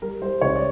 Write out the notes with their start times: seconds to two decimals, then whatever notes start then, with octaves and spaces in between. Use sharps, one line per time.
0.02 G3 A#4
0.22 G3 C5
0.41 C#2 C#5
0.56 D5